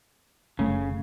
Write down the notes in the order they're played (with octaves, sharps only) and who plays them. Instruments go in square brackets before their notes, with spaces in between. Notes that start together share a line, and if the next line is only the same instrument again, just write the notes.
[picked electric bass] F#1 A3 [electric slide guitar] C#3